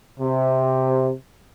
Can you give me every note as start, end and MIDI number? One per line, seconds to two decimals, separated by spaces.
0.20 1.12 48